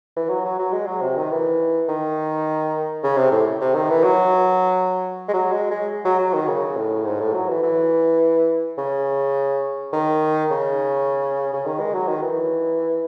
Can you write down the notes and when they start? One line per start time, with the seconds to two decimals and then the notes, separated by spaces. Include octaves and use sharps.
0.16 E3
0.30 F#3
0.45 F#3
0.59 F#3
0.73 G#3
0.87 F#3
1.02 C3
1.17 D#3
1.31 E3
1.88 D#3
3.03 C#3
3.17 C3
3.31 A2
3.61 C3
3.74 D#3
3.89 E3
4.04 F#3
5.28 G#3
5.33 F#3
5.52 G#3
5.71 G#3
6.05 F#3
6.18 F#3
6.33 D#3
6.47 C#3
6.77 A2
7.05 G#2
7.20 A2
7.33 F#3
7.49 E3
7.63 E3
8.78 C#3
9.93 D#3
10.50 C#3
11.53 C#3
11.65 D#3
11.79 G#3
11.94 F#3
12.08 D#3
12.22 E3